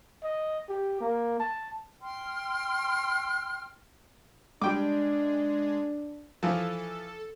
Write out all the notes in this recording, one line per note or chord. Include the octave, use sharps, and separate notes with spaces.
D#5
G4
A#3
A5
G5 C6 F6
G3 G#3 D4 G5 D6
E3 F3 A4